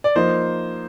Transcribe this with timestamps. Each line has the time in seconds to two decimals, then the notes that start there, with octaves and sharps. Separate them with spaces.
0.04 D5
0.15 F3 A#3 D#4 C5